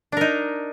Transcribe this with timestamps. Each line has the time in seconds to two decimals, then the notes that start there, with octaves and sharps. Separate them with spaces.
0.12 D4
0.17 A#4
0.21 D#4